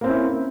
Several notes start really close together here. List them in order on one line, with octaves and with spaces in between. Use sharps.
A#3 C4 C#4 E4